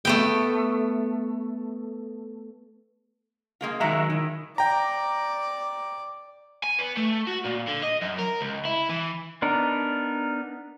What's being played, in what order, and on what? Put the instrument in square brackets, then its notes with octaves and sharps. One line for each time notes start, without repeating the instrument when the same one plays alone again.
[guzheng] A3 B3 G5
[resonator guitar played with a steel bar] G#3 A#3 F4
[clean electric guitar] D#3 F#3 G#3 [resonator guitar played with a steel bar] F#4 E5 A#5
[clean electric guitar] D#3 [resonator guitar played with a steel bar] E4
[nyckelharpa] D5 [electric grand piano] G5 A#5
[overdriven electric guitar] G#5
B3
A3
F#4
A#2
D3
D#5
F#2
A#4
C#2
E4
E3
[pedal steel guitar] B3 D4 D#4 A#4